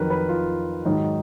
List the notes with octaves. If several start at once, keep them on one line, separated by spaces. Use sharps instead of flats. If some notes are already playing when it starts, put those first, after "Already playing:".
Already playing: F2 D#3 F#3 A#4 B4
B4
F4
G#2 D#3 F#3 D#4